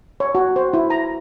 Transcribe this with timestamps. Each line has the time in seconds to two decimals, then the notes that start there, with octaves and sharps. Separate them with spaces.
0.20 C#5
0.35 F#4
0.56 C5
0.73 E4
0.90 A#5